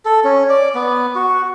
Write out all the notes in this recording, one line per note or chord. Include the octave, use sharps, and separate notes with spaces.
A4
C#4
D5
B3
F#4